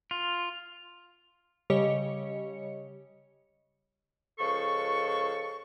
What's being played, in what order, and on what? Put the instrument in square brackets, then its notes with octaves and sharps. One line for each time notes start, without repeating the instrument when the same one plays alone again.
[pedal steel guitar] F4
[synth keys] C#3 G3 G4 C#5 D#5 C#7
[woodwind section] C#2 F3 A4 C#6